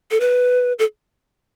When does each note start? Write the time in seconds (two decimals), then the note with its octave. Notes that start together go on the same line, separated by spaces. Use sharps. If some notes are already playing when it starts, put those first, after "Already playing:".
0.11 A4
0.20 B4
0.79 A4